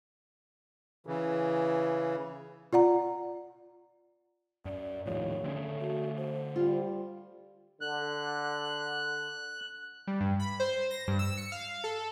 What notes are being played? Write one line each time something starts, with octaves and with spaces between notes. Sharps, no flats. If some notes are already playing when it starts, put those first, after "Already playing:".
C#3 E3
F4 D5 F#5 A#5
F#2 D5
D#1 D#2 A2 F3 C#5
D3 A3 C4 C#4
F#4
C5
G3 F4
D3 F#6
G3
G2
B5
C5
A#6
G2
E6
C#7
F5
A4